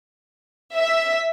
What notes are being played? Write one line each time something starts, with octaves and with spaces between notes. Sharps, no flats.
E5